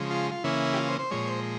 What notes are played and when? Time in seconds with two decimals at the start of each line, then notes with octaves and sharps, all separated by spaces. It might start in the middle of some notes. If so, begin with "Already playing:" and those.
Already playing: C#3 F3 G#3
0.10 F4
0.32 F4
0.44 C#3 E3 A#3 C#4 E4
0.73 G4
0.77 F4
0.88 C5
0.99 C5
1.11 A#2 F3 G#3 C#5
1.27 C5